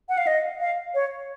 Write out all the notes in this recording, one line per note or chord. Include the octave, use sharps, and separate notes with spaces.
F#5
F5
D#5
F5
C#5